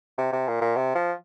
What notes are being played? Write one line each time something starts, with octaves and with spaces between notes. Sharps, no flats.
C3
C3
A#2
A#2
C3
F3